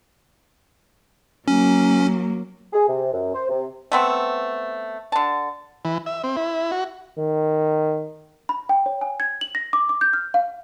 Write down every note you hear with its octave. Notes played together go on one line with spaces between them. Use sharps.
F#3 A#3 C#4
G#4
C3
F#2
C5
C3
A3 B3 C4
D3 A5
E3
E5
C4
E4
F#4
D#3
B5
G5
C#5
G#5
G#6
F#7
A#6
D6
D6
G6
F6
F5